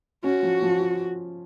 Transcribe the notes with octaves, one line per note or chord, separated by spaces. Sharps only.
C#4 F#4
F3
F3
F4